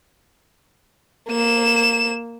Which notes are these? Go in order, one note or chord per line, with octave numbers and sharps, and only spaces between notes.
A#3 E7